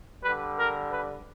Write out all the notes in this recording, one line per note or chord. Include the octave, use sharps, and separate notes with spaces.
D3 G3 B4
A#4
B4